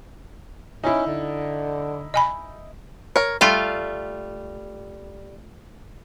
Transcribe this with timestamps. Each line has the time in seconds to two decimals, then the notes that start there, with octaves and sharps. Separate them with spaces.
0.84 C#4 D#4 E4
1.06 D3
2.14 D#5 G#5 B5
3.16 A#4 C#5
3.41 G3 A3 F4 F5